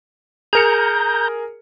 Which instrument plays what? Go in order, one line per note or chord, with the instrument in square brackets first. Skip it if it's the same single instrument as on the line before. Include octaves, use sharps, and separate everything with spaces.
[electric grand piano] G#4 A#4 C#7 [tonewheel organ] A#5 G6